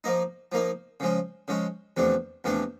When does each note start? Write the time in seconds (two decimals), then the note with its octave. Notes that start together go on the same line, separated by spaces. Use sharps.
0.04 F3 A#3 D#4
0.52 F3 A#3 D#4
1.00 C#3 F3 G#3 C#4
1.48 C#3 F3 G#3 C#4
1.97 E2 C3 F3 A3 D4
2.44 E2 C3 F3 A3 D4